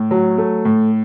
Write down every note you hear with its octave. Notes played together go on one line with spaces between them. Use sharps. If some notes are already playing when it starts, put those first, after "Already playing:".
Already playing: A2
F#3
A3
A2